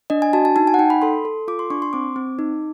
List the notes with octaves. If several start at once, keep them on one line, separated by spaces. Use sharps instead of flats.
D4 D#5
G#5
F#4 A5
A5
D#4 A5
G#5
F#5
D#4 G5
B5
A4 C6
A4
F4 D6
C6
D4 C#6
C6
C4 D6
C4
D#4